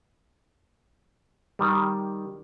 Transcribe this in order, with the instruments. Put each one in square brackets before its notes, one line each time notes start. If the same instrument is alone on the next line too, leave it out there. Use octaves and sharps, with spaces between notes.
[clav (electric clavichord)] D#3 G3